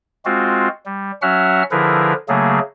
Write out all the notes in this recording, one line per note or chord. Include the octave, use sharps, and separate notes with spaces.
G#3 C4 F4 F#4
G3
F#3 C#4 F#4 E5 F#5 F6
D3 F3 E4 G#4 A#4 B4
C#3 F#3 A3 A#3 G#4